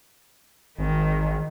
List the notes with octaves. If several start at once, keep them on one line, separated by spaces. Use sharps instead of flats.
G#1 D#3